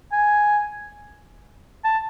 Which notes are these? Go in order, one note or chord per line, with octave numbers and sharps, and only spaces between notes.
G#5
A5